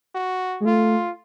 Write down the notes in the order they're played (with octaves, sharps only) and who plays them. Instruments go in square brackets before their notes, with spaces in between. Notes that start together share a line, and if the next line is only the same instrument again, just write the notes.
[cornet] F#4
[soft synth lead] G#3
[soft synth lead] A3 [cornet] F4